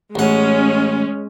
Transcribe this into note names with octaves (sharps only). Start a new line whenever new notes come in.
A1 G#3 C#4 F#5